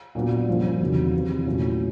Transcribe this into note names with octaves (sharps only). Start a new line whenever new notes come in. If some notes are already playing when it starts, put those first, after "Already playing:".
A#2 F#3 B3 D4 F#4
G2 D3 F3 A#3 C#4
E2 C3 D#3 F#3
E2 C3 E3
A#2 F#3 A3 C#4 E4